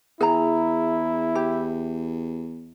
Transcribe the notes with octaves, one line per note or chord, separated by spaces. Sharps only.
E2 E4 G#4 A#5
G4